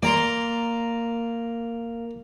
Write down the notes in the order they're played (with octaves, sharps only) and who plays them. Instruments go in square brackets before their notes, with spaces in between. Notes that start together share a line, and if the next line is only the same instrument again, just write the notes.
[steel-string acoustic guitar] A#3 [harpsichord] D5 A#5 C6